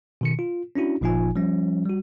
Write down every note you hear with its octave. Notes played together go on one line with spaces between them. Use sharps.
B2 D#3 C#7
F4
C#4 D4 E4 F#4
G1 A#2 F3 D#4 F4 G#5
F3 G3 C#4
G3 F#4